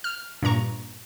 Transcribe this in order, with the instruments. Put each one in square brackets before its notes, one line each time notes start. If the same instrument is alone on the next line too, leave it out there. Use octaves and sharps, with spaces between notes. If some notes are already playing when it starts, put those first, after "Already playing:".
[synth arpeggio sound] F6
G2 A#2 A#5 C#6